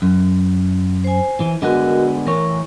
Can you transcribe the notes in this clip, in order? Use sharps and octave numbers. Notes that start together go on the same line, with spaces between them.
F#2
C5 G#5
E3
D3 G#3 B3 F#4 A#4 D#5
E3 A3 A#4 C#5